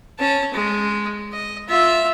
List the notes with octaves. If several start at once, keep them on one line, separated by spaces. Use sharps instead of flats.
C#4 A5
G#3
D#5
F4 E5